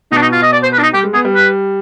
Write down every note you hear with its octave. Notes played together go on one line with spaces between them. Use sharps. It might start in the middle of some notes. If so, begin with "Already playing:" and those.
B2 D#4
D4
D#4
F4
D#5
D5
C5
B4
D4
D#4
G3 G4
G#3
B3 G#4
G3
B4